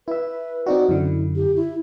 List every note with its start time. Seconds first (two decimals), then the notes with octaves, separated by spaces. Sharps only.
0.08 E4 B4 E5
0.66 C4 D#4 F#4 D5
0.89 F#2 D3 E4
1.36 G4
1.56 E4